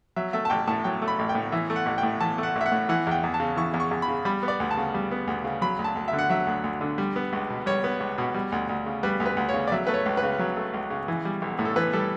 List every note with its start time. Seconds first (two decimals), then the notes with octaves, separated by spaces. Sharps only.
0.16 F#3 E5
0.33 A3 E5
0.45 A5
0.50 A1 G5
0.67 A2 A5
0.84 F#3 G5
1.02 A3
1.08 B5
1.19 A1
1.29 G5
1.35 A2
1.52 E3 E5
1.70 A3
1.76 F#5
1.86 A1
1.98 G5
2.03 A2
2.21 E3 A5
2.38 A3
2.43 F#5
2.56 A1
2.61 E5
2.66 F#5
2.72 A2
2.89 E3 F#5
3.07 E2 G5
3.23 E2
3.34 A5
3.40 C#3
3.57 E3 C#6
3.74 E2
3.80 C#6
3.91 E2
4.02 B5
4.08 C#3
4.25 G3 B5
4.43 B3
4.48 D5
4.60 D2
4.71 A5
4.77 C#3
4.94 G3
5.11 B3
5.27 D2
5.44 C#3
5.61 F#3 B5
5.79 D2
5.84 A5
5.96 D2
6.08 E5
6.13 D3
6.19 F#5
6.30 F#3 E5
6.47 D2
6.64 D2
6.81 D3
6.98 G3
7.16 B3
7.33 C#2
7.50 B2
7.66 G3 C#5
7.84 B3
8.00 C#2
8.18 B2
8.34 G3
8.52 D2
8.69 D2
8.86 C#3
9.03 G3 B4
9.20 D2
9.26 B4
9.37 D2
9.49 C#5
9.54 C#3
9.68 D5
9.72 F#3 E5
9.87 A3 B4
9.94 C#5
10.06 C#2
10.17 B4
10.23 C#3
10.39 F#3
10.57 A3
10.74 C#2
10.90 C#3
11.08 E3
11.25 G3
11.42 B1
11.59 A2
11.65 A4
11.76 E3 B4
11.93 G3 A4